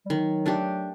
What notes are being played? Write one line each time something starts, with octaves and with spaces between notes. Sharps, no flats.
G3
D#3 F#3
A3 D4 G4